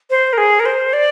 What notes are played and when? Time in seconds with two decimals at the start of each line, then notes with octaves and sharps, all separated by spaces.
0.10 C5
0.33 A#4
0.38 G#4
0.60 A#4
0.65 C5
0.93 D5